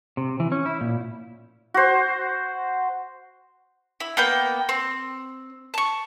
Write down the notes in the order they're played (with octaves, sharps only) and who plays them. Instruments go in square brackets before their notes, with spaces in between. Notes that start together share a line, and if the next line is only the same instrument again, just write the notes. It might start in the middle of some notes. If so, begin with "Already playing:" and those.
[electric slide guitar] C3
E3
C#4
E4
A#2
[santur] F#4 C5
[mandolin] E4
A#3 B3 G5
C4
A5 C#6